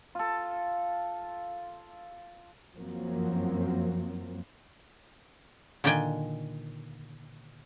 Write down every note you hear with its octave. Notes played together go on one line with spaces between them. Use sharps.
F4 A4
F#2 F3 F#3 A#3 C4
A#2 D3 D#3 D5 G5 G#5